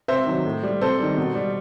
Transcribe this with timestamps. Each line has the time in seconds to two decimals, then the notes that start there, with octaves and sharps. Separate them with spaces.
0.08 C3 C5 E5
0.27 D#3 F#3
0.45 A2
0.63 G3
0.81 C3 A4 C5
0.99 D#3 G3
1.18 B2
1.35 G3